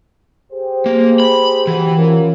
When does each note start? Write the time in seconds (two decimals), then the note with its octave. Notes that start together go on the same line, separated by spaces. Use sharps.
0.52 G4 G#4 C5
0.86 A#3
1.20 B5
1.67 E3 F#4 G4
1.96 C#4 F4 A#4